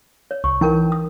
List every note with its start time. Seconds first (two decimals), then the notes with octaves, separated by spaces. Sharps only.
0.31 C#5
0.44 C2 C#6
0.61 E3 D#4 A#4 G5
0.92 D#6